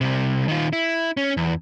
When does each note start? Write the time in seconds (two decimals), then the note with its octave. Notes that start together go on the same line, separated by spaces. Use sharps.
0.01 C2 C3
0.48 D#3 F4
0.73 E4
1.17 C#4
1.37 E2